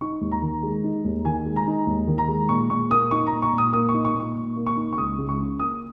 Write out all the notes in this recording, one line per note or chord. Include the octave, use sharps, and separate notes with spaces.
D#4 C#6
D#2
A#5
D#3
G#3
D#4
D#2
D#3 G#5
G#3
A#5
D#4
D#2
D#3
A#5
G#3
A#2 C#6
A#2 C#6
A#3 D#6
D#4 C#6
A#5
A#2
C#6
A#2
D#6
A#3 D#6
D#4 C#6
C#6
A#2
C#6
A#2
A#3
C#6
D#4
C#6
C#2 D#6
C#2
C#6
C#3
A#3 D#6